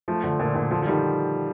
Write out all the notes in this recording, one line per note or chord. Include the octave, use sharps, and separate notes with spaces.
F3 A3
D3 F3
A#2 D3
A#2 D3
D3 F3
F3
D#3 G3